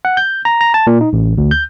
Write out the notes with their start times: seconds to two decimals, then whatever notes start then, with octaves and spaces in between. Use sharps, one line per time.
0.05 F#5
0.17 G6
0.45 A#5
0.61 A#5
0.74 A5
0.87 A#2
1.01 D#4
1.13 A1
1.38 D2
1.51 G6